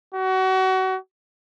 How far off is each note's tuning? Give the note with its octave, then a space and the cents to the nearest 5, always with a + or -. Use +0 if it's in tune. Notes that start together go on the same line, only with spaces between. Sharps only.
F#4 +30